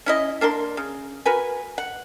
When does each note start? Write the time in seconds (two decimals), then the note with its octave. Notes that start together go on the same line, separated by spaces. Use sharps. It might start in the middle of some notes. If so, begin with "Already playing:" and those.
0.06 C#4 E4 D#5
0.41 A#3 D4 A#4 C6
0.77 C#3
1.25 F#4 A#4 B4 G#5
1.78 F#5